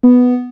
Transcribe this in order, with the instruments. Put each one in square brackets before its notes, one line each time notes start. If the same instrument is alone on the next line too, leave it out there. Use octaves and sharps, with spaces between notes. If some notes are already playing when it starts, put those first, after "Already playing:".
[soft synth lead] B3